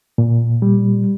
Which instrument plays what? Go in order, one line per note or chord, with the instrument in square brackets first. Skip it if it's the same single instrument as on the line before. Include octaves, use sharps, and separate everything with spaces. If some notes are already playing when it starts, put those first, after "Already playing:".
[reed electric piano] A#2
G3